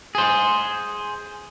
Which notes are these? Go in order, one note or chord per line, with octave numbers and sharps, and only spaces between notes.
G#4 C5